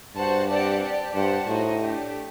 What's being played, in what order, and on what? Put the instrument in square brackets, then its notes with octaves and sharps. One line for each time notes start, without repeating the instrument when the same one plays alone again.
[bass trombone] G2 [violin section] F#4 C5 F#5 A5
[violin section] C4 G4 D5 F#5 A5
G4 D5 A5
[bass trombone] G2 [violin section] G4 C5 F#5 A5
[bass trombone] A2 [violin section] D#4 F#4 C5 D#5
[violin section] A3 D4 G4